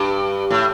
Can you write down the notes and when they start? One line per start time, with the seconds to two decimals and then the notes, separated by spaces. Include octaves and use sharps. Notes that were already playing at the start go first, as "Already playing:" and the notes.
Already playing: G2
0.50 A2